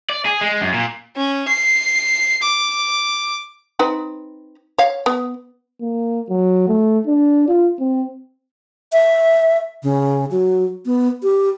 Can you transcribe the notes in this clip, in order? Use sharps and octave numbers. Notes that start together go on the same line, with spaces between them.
D5
G#4
G#3
F#2
A#2
C#4
C7
D6
C4 D#4 B4
C#5 F5
B3
A#3
F#3
A3
D4
F4
C4
E5
C#3
F#3
B3
G4